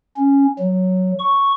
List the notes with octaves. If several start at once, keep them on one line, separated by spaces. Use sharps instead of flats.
C#4
F#3
C#6